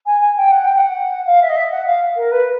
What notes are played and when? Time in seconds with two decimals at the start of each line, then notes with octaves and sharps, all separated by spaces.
0.06 G#5
0.21 G#5
0.36 G5
0.51 F#5
0.64 G5
0.77 F#5
1.26 F5
1.41 E5
1.49 D#5
1.56 E5
1.71 F#5
1.86 F5
2.16 A#4
2.31 B4